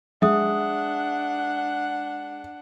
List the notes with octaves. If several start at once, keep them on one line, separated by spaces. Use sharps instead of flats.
G#3 D4 E5 F#5 D#6